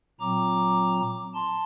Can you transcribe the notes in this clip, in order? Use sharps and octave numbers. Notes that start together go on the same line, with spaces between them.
A#2 F#3 C4 A#5 D6
A5 C6